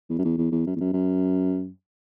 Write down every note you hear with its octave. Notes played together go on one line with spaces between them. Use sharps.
E2
F#2
E2
E2
E2
F#2
E2
F#2
F#2